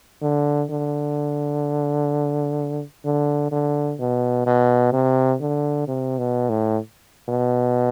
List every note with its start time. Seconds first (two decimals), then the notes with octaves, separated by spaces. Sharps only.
0.22 D3
0.70 D3
3.05 D3
3.52 D3
4.00 B2
4.46 B2
4.93 C3
5.41 D3
5.88 C3
6.18 B2
6.50 A2
7.29 B2